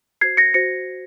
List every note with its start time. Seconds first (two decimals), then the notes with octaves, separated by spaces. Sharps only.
0.21 F#4 C5 G#6 C7
0.37 A#6 C#7
0.54 F#4 C5 A#6 C#7